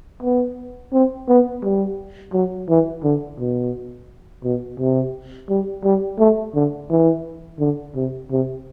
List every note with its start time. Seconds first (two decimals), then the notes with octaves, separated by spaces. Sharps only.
0.23 B3
0.93 C4
1.28 B3
1.63 G3
2.33 F#3
2.69 E3
3.04 D3
3.39 B2
4.44 B2
4.80 C3
5.50 G3
5.84 G3
6.20 A3
6.55 D3
6.90 E3
7.60 D3
7.95 C3
8.31 C3